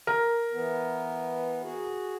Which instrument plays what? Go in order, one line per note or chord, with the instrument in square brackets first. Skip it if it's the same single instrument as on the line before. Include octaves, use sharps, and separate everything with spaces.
[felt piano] A#4
[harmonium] E3 B3
F#4 G#4